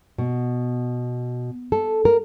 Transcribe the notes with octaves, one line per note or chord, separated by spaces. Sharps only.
B2
A4
A#4